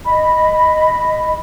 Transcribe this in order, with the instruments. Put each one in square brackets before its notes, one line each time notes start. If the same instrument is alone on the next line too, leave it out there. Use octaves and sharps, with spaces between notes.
[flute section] D#5 B5